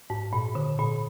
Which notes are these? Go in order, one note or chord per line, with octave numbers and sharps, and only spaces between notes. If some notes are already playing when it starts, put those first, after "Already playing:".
G#2
A#2
D3
A#2